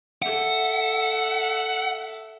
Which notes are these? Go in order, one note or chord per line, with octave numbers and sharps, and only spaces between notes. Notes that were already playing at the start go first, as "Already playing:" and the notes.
A4 E5 F#5